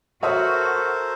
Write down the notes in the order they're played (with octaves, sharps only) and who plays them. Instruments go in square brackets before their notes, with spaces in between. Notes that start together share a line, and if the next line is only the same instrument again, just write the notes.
[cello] F#4 [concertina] A4 A#4 C5 [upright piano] C#5 E5 D#6